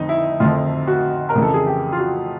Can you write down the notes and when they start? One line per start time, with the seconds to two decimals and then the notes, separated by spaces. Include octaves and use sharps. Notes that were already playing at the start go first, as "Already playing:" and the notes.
Already playing: F2 D3 F3 D#4
0.09 E4
0.40 F2 D3 F3 F4
0.87 F#4
1.29 A#4
1.35 F2 C#3 E3
1.42 A4
1.54 G#4
1.66 G4
1.92 F4
1.98 F#4